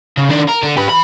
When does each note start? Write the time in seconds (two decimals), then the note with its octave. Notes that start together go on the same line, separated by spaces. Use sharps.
0.17 C#3
0.29 D#3 D4
0.48 A#4
0.63 D3
0.77 G4 B4
0.89 E3 B5